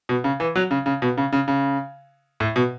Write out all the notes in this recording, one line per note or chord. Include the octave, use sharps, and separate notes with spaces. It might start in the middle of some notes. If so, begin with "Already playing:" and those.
B2
C#3
E3
F#3
C#3
C#3
B2
C#3
C#3
C#3
A2
B2